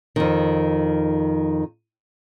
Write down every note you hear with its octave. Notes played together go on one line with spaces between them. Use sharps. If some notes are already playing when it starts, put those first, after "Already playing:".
F2 D#3